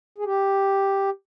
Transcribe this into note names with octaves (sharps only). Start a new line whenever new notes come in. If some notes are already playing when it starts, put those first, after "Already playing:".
G#4
G4